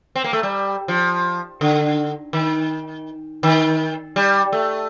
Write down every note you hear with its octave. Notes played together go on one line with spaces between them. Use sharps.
C4
A#3
A3
G3
F3
D3
D#3
D#3
G3
A3